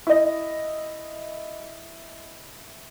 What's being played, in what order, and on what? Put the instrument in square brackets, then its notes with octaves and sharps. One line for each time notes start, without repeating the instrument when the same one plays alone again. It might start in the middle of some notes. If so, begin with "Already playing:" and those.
[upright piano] E4 D#5